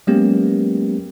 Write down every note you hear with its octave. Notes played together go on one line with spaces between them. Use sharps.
F#3 G#3 A#3 B3 C#4 G4